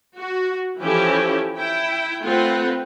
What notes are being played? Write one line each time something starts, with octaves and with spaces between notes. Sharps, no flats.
F#4
E3 F3 C#4 E4 G4 A4
E4 G5
A3 C4 F4 B4 F#5